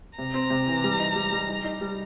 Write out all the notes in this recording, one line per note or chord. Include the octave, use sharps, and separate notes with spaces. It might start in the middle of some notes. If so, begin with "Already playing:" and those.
C3 A#5
C4
C3
E3
G3
D#4
G3
G3
D#4
D#4
G3